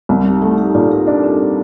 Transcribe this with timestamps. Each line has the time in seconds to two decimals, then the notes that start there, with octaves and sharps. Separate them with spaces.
0.09 C2
0.26 D#4 G4
0.42 A3 D#4 G4
0.58 D#4 G4
0.74 A#2 F4 A4
0.91 G4 A#4
1.07 D4 F4 A4
1.23 C4